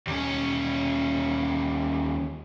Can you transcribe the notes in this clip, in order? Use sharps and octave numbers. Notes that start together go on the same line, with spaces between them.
D#2 C#4